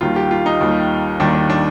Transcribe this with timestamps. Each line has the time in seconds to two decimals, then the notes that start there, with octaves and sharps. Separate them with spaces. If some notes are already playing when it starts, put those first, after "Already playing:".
0.01 D#2 D#3 G3 F4
0.16 G4
0.31 F4
0.46 D#4
0.61 D#2 D#3 G3
1.20 D#2 D#3 G3 D4
1.34 D4
1.50 D4